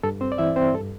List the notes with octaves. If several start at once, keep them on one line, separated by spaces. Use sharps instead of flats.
G2 A4
C4 C5
D5
E3 E4 E5
C4 C5
G2 A4